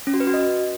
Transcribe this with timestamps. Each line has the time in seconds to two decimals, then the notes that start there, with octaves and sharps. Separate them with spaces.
0.07 C#4
0.14 F#4
0.20 B4
0.27 F#4
0.34 D#5